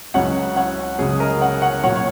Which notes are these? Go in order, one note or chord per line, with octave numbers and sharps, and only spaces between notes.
C#2 C#3 F#3 C#5 F#5
C#5 F#5
C#2 C#3 F#3 G#4 C#5
A#4 D#5
C#5 F#5
C#5 F#5
A#2 F#3 C#5 F#5
C#5